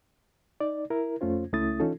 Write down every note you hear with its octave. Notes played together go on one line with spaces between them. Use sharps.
D#4 D5
E4 A#4
F2 A3 C#4 F4 C5
C#2 A3 C#4 E4 D#6 A6
E3 C#4 D#4 F4 A4